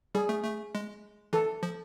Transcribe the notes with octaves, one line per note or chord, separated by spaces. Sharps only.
G3 G#4
A3
A3
G#3
E3 A4
F3